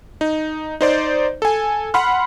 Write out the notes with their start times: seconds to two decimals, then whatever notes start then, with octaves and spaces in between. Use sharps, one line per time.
0.21 D#4
0.81 D#4 C5 D5
1.42 A4 G#5
1.94 F#5 B5 C6 F6